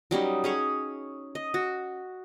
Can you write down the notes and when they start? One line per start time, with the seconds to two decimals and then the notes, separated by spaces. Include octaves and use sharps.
0.11 F#3 G3 C#4 D#4
0.44 C#4 G#4 C#5
1.35 D#5
1.54 F#4